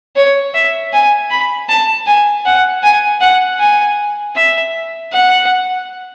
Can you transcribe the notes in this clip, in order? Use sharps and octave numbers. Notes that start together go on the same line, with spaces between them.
C#5
E5
G#5
B5
A5
G#5
F#5
G#5
F#5
G#5
E5
F#5